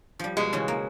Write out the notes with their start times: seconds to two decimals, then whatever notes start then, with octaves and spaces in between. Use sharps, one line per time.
0.19 F3 G3
0.37 B2 G#3
0.53 C#3 E3 C#4
0.68 A#3